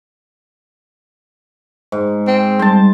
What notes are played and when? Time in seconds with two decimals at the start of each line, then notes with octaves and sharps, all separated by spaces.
1.92 G#2
2.27 C4
2.59 G3 C5 A5